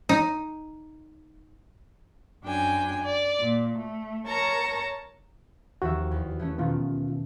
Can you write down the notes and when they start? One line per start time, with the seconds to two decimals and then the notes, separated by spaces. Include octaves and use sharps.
0.09 D#4
2.43 F#2 D4 G5 G#5
3.04 D5
3.41 A#2
3.78 A3
4.27 A#4 C#5 A5 A#5 C#6
5.82 D#2 F3 F#4 E5
6.11 E2
6.39 E3 A3 C#4
6.58 B2 D#3 A3 B3 F4